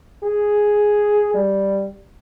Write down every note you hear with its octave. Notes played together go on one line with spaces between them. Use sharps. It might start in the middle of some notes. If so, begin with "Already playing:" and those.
G#4
G3